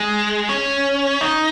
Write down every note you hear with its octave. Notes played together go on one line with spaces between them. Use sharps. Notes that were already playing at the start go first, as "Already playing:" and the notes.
Already playing: G#3
C#4
D#4